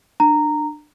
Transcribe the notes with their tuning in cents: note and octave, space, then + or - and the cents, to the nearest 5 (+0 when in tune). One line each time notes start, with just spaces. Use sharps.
D4 +25 A#5 -10